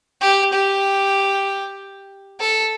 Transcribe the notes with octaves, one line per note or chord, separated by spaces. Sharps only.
G4
G4
A4